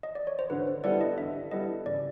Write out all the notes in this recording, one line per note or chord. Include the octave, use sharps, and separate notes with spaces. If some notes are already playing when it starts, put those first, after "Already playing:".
D#5
D5
C#5
C5
D3 B4
C5
G3 B3 E4 A4 D5
D#5
D3 E5
G3 B3 E4 A4 D#5
C#3 D5